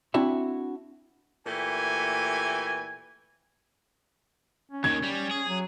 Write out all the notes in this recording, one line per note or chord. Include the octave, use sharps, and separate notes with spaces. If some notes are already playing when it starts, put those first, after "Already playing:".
C4 D4 E4 F#4 E5 B5
A#2 E3 A3 G4 G#5
C#4
D#2 D#3 G#6
G3
G#4
F#3